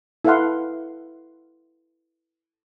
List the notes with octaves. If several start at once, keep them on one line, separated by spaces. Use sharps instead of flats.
E4 A4 B4 F5 F#5 C6